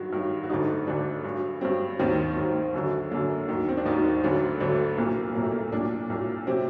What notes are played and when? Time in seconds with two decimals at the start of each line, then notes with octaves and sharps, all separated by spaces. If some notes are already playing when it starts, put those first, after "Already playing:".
Already playing: G2 D#3 F#3 F#4
0.12 G2 D#3 F#3
0.44 F#4
0.49 D2 D3 F#3 D#4
0.87 D2 D3 F#3 D4
1.24 G2 F#3
1.61 G2 F#3 C4
1.99 D#2 D#3 F#3 C4
2.36 D#2 D#3 F#3
2.74 F#2 D3 F#3
3.11 F#2 D3 F#3 A#3
3.48 D#2 D#3 F#3
3.68 C4
3.77 D4
3.86 D#2 D#3 F#3 D#4
4.24 D2 D3 F#3
4.60 D2 D3 F#3 D4
4.98 C2 A#2 F#3 A#3
5.35 C2 A#2 F#3 A#3
5.43 A3
5.51 A#3
5.72 C2 A#2 F#3 D4
6.10 C2 A#2 F#3
6.47 C3 F#3 C4